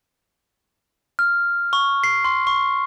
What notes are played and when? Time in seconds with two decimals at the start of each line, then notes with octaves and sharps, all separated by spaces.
1.19 F6
1.73 C#6
2.04 C7
2.25 C6
2.47 C#6